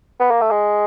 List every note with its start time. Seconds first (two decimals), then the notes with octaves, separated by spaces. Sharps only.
0.20 B3
0.31 A#3
0.41 A3
0.50 G#3